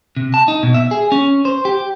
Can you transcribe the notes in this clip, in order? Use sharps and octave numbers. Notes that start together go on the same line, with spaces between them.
C3
A5
D#4
B2
E5
G#4
C#4
C5
G4